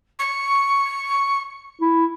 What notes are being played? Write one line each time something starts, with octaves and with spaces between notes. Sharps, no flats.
C#6
E4